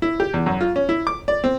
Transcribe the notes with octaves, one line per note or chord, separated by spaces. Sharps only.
E4
G4
E2
F#2
F4
C#4
E4
D6
D5
C4